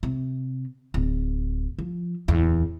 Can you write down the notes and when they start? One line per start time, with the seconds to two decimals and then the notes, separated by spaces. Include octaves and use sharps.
0.03 C3
0.94 D1
1.79 F3
2.28 D1 E2